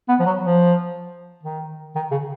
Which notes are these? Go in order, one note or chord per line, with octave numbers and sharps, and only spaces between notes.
B3
F3
F#3
F3
D#3
D#3
C#3